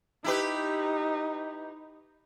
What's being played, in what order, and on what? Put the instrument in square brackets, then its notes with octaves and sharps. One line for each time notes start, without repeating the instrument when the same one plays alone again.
[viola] D#4 [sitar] E4 G4 B4